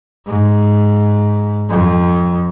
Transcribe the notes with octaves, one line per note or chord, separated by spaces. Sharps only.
G#2
F2